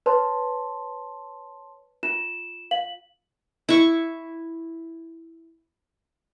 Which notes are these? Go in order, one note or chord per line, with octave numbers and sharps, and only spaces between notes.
B4 C#5 A5 C6
F4 E7
F5 F#7
E4 C#6